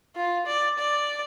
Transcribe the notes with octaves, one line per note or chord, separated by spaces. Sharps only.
F4
D5
D5